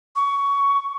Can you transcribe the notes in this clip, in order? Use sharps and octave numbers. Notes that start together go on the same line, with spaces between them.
C#6